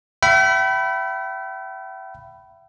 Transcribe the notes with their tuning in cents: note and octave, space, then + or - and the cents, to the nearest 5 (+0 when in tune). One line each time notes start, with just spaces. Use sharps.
E5 +30 G5 -40 B5 +0